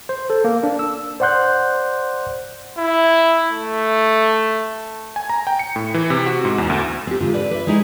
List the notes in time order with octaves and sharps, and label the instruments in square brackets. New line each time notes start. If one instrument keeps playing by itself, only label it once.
[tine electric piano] C5
A4
A#3
D4
E6
C5 D5 F#5 C6 F#6 G6
[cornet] E4
A3
[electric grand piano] G#5
A#5
G5
C#7
A2
E3
C3
F#4
G#2
E2
D2
[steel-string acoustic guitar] C4 G4
G#2 D3 F4
D4 B4 D5
B4 E5
G#3 A#3 D#4 E4 G#4